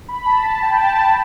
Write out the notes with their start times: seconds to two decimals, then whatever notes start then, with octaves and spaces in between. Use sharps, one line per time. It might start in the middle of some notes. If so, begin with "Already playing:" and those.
0.08 B5
0.26 A5
0.45 A5
0.62 G5
0.80 A5